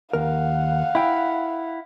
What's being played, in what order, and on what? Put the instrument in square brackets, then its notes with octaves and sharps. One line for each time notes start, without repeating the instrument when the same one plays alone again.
[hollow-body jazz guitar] D#2 A#4 [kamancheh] F5 F#5
[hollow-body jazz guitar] E4 G5